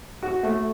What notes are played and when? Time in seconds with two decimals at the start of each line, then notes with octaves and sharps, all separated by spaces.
0.23 F#4
0.43 A3